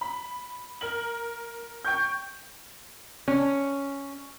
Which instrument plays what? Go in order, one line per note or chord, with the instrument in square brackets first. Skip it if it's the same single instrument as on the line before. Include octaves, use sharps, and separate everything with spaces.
[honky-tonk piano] B5
A#4 F#7
G5 C#6 G6
[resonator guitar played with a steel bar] C#4